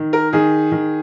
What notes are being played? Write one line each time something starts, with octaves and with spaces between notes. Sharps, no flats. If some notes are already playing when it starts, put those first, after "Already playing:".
Already playing: D#3
A#4
D#3 G#4
D#3